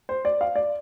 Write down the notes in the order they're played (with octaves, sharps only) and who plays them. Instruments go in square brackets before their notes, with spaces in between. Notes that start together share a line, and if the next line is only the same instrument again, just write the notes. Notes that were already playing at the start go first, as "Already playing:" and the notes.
[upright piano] C5
D5
F5
D5